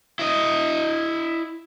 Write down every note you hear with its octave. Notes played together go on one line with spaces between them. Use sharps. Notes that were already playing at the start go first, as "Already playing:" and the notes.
E4 D#5